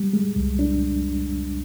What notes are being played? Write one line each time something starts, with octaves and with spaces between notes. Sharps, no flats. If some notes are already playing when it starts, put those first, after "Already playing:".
Already playing: G3
G#3
C2
D4